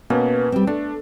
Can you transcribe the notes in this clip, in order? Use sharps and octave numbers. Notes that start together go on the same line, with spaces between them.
B2 A#3 B3 C#4
G3 C4
A3 D4